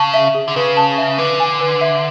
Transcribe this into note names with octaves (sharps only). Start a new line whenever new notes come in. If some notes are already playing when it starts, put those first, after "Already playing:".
Already playing: C#3 A5
E5
G#4
D3
C#3 B4
A5
E5
D3 B4
G#5
B4
E5